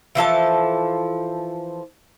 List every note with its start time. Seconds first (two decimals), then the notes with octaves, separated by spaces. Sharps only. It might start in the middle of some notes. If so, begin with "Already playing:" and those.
0.15 E3 F3 A4 A5